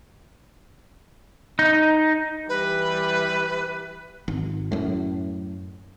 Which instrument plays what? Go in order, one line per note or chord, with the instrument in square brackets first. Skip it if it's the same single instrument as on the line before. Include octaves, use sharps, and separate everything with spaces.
[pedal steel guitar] D#4
[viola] E3 G3 [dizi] B4
[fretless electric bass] G#1
F#2 A2